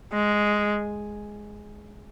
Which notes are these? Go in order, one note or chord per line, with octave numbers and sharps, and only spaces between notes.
G#3